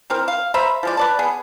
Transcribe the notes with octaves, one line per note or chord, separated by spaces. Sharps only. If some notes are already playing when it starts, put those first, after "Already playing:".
E3 C4 A#4
F5
C5 E5 A#5 B5
F3 G#3 D5
B4 D5 A5
B3 G#4